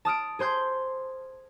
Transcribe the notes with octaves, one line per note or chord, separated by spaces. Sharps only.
A5 D#6 F6 D7
G#4 C5 C6 G6